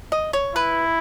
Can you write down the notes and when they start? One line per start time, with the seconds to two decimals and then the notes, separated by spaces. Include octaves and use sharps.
0.12 D#5
0.33 C#5
0.55 E4 B4